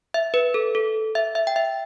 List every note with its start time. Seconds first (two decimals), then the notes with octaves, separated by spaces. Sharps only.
0.14 E5
0.34 B4
0.54 A4
0.75 A4
1.15 E5
1.35 E5
1.47 G5
1.56 E5